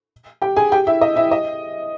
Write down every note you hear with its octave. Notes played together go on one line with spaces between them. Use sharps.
G4 G5
G#4 G#5
G4 G5
E4 E5
D#5
E4 E5
D#5